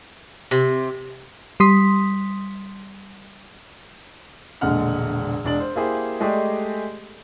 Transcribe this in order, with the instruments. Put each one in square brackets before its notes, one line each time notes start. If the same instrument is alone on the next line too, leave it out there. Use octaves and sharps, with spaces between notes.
[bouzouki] C3
[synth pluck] G3 C6 D#6 B6
[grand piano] E1 A#1 D3 G#3 F#5 F6
E1 G#3 D4 D5 A6 F#7
C5
A#3 E4 G4 G#4 C5
G#3 A3 G4 G#4 D5 D#5